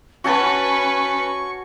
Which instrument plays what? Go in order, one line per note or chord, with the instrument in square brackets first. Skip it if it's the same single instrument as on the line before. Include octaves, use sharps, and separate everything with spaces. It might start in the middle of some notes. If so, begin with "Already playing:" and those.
[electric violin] C#4 B4 [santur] F#4 G#5 A5 [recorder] C#6